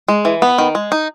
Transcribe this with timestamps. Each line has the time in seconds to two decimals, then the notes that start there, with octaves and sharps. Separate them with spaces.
0.08 G#3
0.25 E3
0.42 B3
0.58 D#3
0.75 G#3
0.92 D#4